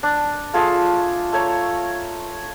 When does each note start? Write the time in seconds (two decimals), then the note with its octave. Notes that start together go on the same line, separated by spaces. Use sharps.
0.03 D4
0.54 A3 F4 G#4 A4
1.33 A3 C#5 A#5